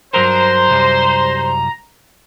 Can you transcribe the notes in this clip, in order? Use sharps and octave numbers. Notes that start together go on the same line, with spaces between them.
G2 F#3 A#4 C5 A#5
C2 F#2 G3